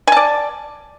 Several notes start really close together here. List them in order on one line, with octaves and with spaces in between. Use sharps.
G#5 A5 D5